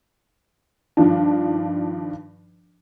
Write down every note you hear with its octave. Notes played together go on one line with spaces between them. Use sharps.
G2 D#3 F3 D4